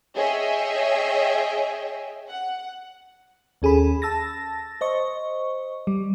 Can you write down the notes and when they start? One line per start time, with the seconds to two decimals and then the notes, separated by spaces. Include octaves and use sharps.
0.16 G#4 C#5 D#5 E5 G5
2.29 F#5
3.62 D#2 C#4 G#4 A4 B5
4.02 A5 E6 A6 A#6
4.81 C5 D#5 C#6
5.87 G3